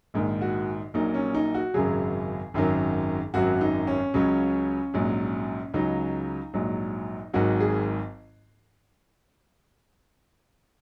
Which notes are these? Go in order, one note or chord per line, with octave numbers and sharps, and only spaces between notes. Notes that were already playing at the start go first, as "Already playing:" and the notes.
A#1 G#2 D#3
F#4
A#1 A#2 F#3 D#4
C#4
D#4
F#4
G#1 F#2 C#3 F#3 G#4
G#1 F#2 D#3 F#3
G#1 F#2 F#3 F#4
D#4
C#4
C#2 C#3 F#3 C#4
A#1 G#2 F#3
C#2 C#3 F#3 D#4
A#1 G#2 F#3
G#1 G#2 D#3 F#3 F#4
G#4